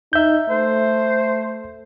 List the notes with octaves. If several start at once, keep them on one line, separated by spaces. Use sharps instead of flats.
D#4 E5 G6
A3 C5